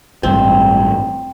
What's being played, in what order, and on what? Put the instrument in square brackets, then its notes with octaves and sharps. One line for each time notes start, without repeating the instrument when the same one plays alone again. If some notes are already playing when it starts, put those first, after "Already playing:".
[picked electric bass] A1 G2 [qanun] C4